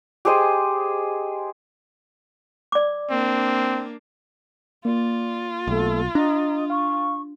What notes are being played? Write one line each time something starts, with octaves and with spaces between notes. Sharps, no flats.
G4 G#4 C5 D#5
D5 D6
A#3 C4 D4
A#3 F4 D5
B1 A3
D4 D#5 A#5
F5 C#6